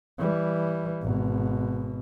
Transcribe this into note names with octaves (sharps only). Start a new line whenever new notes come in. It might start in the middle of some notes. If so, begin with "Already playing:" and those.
E3 G3
G#1 B2